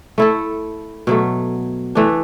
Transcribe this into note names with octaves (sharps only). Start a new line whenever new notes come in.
A3 E4 A4
B2 F#3 A3
E3 A3 D4